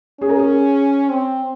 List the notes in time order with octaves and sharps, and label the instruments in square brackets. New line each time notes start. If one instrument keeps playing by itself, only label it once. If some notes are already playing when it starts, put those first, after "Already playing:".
[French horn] C#4 [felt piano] G#4
[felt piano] A#4
G#4
[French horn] C4